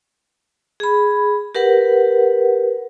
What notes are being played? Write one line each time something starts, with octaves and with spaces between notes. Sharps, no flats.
G#4 B5
G4 A#4 B4 F#5